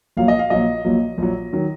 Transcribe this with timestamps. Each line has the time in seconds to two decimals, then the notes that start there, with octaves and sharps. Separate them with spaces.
0.17 A#1 A#2 F#3 F5
0.28 D#5
0.39 F5
0.50 A#1 A#2 F#3 D#5
0.85 A#1 A#2 F#3
1.18 A#1 A#2 F#3
1.53 D#3 F#3